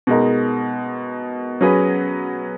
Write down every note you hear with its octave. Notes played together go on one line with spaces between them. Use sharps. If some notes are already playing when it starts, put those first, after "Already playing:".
B2 G#3 D#4 A#4
F#3 C#4 G#4 B4